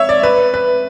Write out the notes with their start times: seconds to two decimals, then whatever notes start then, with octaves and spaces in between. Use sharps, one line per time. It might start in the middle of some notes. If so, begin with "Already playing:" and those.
Already playing: C#5 E5
0.09 D5
0.23 B4
0.54 B4